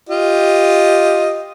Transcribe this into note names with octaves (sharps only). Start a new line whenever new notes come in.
F4 G4 D#5